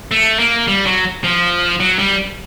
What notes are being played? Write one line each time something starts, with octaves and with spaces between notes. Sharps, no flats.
A3
A#3
G3
F#3
F3
F#3
G3